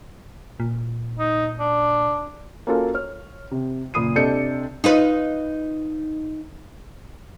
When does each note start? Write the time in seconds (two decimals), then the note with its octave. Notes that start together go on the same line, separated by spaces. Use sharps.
0.60 A#2
1.19 D#4
1.60 D4
2.67 A#3 C#4 F4 F#4 A4 A#4
2.94 C#5 F6
3.51 C3
3.94 F#1 A#2 B5 D#6 C7 D#7
4.16 C3 D4 A4 D#5 G6 C#7
4.84 D#4 F4 B4